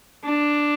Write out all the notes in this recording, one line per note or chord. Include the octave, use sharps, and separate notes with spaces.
D4